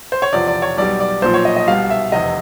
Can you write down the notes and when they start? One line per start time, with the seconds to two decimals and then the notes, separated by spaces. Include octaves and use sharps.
0.12 C5
0.22 C#5
0.33 E2 C3 F3 D5
0.47 D5
0.62 C#5
0.77 B1 B2 G3 D5
1.00 D5
1.22 B1 A#2 F3 C5
1.34 C#5
1.45 D#5
1.56 D#5
1.67 C2 B2 G3 F5
1.90 E5
2.12 F1 E2 C3 D#5